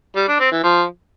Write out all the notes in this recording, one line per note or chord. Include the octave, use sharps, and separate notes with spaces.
G3
D4
C4
E3
F3